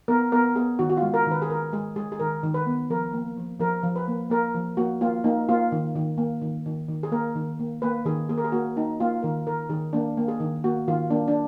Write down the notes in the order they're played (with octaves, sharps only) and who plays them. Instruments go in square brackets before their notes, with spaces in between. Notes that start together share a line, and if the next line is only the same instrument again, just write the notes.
[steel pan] B3 A#4
B3 A#4
B3 G#4
D#3 F#4
F#4
F4
G#3
A#4
D#3 B4
G#4
D#3 A#4
G#3 G#4
G#3 G#4
G#4
D#3 A#4
D#3
B4
B3
F3 A#4
A#3
F3
F3 A#4
F3
B4
A#3
A#3 A#4
F3
A#3 F#4
A#3 F4
A#3 D#4
A#3 F4
D#3
D#3
A#3
D#3
D#3
D#3
G#4
A#3 A#4
D#3
A#3
A#3 B4
D#3 G#4
A#3 G#4
A#4
G#4
A#3 F#4
A#3 D#4
A#3 F4
D#3 A#4
D#3 A#4
D#3 G#4
A#3 D4
A#3
G#4
D#3
A#3 F#4
D#3 F4
A#3 D4
D4